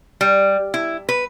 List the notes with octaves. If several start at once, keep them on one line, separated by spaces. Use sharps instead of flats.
G3
E4
B4